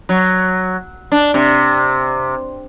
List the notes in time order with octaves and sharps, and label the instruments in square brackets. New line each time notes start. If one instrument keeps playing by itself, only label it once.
[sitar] F#3
D4
C3